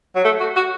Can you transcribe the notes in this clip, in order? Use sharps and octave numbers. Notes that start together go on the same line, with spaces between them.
F#3
A3
F#4
F#4